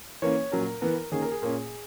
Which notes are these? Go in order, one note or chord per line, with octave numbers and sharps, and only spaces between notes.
E3 A#3 C#4 C#5
A#2 F#3 C#4 A#4
E3 B3 A#4
D#3 A#3 C#4 G#4
A#4
G#4
A#2 A#3 C#4